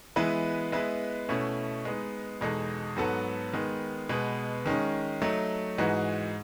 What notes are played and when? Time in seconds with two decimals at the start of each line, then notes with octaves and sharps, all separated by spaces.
0.16 E3 G#3 B3 E4 B4
0.72 G#3 B3 E4 B4
1.29 B2 A3 C#4 E4
1.85 G#3 B3 D#4
2.41 E2 B2 G#3 D#4 A4
2.96 G#2 F#3 B3 F#4 A4
3.53 D#3 G#3 B3
4.09 B2 G#3 B3
4.66 D#3 G#3 C#4
5.22 F#3 A3 D#4
5.78 G#2 E3 G#3 D#4 F#4